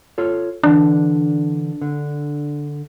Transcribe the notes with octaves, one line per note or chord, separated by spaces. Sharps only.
F4 A4 C#5
D3 E3 D4 A5
D3